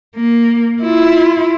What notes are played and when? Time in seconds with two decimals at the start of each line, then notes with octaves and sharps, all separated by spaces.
0.16 A#3
0.82 E4 F4